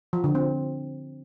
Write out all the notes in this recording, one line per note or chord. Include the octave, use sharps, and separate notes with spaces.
F3
D3
C4